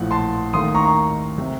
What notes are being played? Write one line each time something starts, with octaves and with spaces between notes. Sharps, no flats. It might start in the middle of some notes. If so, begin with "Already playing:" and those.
Already playing: A#1 A2 F3 F#5
A5 C6
D#2 D#3 A3 C6 D#6
A#5 C#6
A#5 C#6
C3